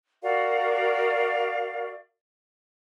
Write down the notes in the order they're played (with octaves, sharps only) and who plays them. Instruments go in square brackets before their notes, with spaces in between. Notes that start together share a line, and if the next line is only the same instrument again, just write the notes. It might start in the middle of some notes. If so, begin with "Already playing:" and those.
[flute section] F#4 A#4 D5 F5